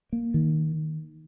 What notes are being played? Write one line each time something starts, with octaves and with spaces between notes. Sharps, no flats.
A#3
D#3